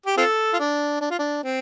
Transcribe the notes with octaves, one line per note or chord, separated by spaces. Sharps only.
G4
C4 F4 A4
F4
D4
D4
F4
D4
C4